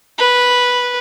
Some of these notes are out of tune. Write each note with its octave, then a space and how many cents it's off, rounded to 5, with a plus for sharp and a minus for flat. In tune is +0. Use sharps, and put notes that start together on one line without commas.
B4 -5